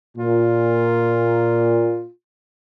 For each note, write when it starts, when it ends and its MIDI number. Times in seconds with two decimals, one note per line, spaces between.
0.18 2.03 46
0.18 2.11 65